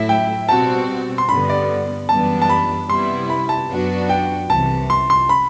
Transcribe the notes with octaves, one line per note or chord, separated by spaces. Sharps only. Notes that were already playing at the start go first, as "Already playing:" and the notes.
Already playing: A2 F#3 A3 E4 E5
G5
B2 G3 C4 F#4 A5
C6
G2 D3 G3 B3 B5
D5
F#2 E3 G3 B3 D4 A5
A5
B5
C3 G3 B3 E4 C6
B5
A5
F#2 F#3 B3 D4 F#4
G5
C2 C3 E3 A5
C6
C6
B5